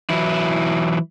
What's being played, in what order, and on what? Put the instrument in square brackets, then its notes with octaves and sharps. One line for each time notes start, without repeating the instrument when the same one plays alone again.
[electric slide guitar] E3 F#3 E4